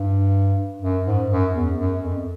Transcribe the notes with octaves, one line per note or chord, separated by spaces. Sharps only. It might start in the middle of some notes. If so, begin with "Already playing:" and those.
Already playing: G2
F#2
G#2
F#2
E2
F#2
F2